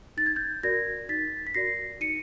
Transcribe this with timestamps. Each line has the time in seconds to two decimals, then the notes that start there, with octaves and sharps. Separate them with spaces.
0.17 D#4 A6
0.26 G#6
0.36 G6 A6
0.63 F#4 A#4 D5 G#6 A#6
1.09 D#4 A6 B6
1.47 B6
1.54 F#4 A#4 D5 A#6 C7
2.00 D#4 C#7 D#7